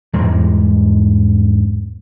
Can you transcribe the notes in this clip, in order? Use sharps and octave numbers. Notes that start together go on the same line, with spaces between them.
E2 G#2 G3 G#3